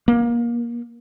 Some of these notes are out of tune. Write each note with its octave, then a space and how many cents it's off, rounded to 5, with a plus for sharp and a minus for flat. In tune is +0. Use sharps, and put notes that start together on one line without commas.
A#3 +25